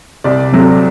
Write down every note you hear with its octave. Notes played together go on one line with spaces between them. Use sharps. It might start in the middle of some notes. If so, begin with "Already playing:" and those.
C2 D5
C3 F#3 A3 C4